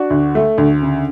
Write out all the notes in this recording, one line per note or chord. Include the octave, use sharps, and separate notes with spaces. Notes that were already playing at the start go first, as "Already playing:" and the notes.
Already playing: D4 F#4
D2
A3
D2
C#3